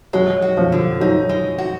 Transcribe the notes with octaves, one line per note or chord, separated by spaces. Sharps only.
F#3 G#3
F#4
F3
D3
F#3 D#4
G#3
F#4